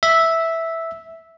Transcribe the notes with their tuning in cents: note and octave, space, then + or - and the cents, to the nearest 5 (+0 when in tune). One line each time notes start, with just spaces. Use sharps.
E5 -5